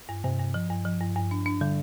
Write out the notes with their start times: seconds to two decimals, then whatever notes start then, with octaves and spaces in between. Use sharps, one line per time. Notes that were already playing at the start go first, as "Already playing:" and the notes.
0.09 G2
0.24 G2 C3
0.39 G2
0.54 F3
0.70 G2
0.85 F3
1.00 G2
1.16 G2
1.31 D4
1.46 D4
1.61 D3 G3